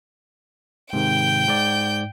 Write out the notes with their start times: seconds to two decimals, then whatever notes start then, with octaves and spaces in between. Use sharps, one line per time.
0.93 G#2 C3 D#3 G5 G6
1.48 G#2 D5